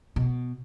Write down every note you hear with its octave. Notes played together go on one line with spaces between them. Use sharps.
B2